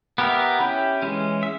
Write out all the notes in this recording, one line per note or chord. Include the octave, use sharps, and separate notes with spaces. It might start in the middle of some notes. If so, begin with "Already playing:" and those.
B3 G4 A#4 E5
C#4 E4 G4
E3 G#3 C#4
E5